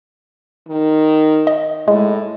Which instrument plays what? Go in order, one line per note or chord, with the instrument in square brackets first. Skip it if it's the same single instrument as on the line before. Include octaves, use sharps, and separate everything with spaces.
[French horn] D#3
[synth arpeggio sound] D#5
[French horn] A2 [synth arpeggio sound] G#3